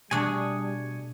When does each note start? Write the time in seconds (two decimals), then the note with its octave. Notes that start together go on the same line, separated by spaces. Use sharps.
0.11 B2 G3 A3 D4 G#4 G#5 C#6 D#6